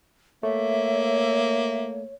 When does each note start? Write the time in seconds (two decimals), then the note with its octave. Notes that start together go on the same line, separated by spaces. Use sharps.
0.43 A3 A#3 C#5 E5